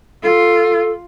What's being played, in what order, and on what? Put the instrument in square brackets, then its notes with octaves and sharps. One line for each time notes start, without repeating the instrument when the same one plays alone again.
[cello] F4 [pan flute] A4